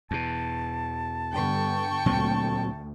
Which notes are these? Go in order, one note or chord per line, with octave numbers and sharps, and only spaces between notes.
E2 B2 A5
G2 D3 B3 G5 C#6
D2 A#2 F#3 C4